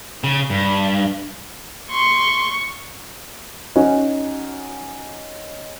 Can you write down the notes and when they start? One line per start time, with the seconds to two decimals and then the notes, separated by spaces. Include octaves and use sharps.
0.24 C#3
0.50 G2
1.91 C6 C#6
3.76 C#4 D#4 F#4